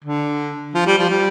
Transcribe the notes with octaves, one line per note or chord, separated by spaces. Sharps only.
D3
F3
G3
F3
G3